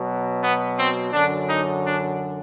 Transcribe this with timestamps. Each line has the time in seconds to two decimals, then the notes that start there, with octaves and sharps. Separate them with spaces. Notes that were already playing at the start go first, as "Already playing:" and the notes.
Already playing: B2 F#3
0.41 B3
0.76 C4
1.12 F#2 D3 F#3 D4
1.49 D#4
1.85 D4